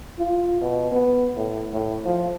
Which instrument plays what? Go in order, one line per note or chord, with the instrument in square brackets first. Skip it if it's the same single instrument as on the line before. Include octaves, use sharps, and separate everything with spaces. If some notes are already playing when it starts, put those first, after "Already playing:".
[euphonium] F4
B2
B3
A2
A2
F3